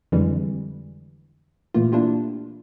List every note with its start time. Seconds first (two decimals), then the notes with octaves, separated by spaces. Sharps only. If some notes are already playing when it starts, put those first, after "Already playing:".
0.12 F2 D3 E3 G3 G#3
1.74 A#2 E3 A3 A#3 F4
1.92 A#3 D4 E4 F4 G4